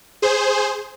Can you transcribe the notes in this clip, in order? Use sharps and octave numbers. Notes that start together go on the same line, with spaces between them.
G#4 C5